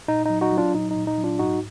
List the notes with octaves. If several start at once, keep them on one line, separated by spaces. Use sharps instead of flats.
A#2 D#4
F#3 D#4
D#4 F#4
F#3
D4 F4
A#2 D#4
D#4
A#2
D#4
F#3
D4 F4
G#2 D#4 F#4